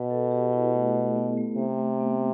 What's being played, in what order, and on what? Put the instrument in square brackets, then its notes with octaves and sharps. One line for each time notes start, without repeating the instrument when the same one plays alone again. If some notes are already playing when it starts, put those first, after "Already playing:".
Already playing: [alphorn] B2 [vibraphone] B4
[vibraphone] A4
A4
G4
E4
A3
A3
B3
A3
[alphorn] C3 [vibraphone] A3
[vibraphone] A3
B3